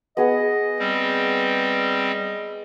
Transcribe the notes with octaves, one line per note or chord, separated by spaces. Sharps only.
B3 G#4 D#5 F#5
G3 C4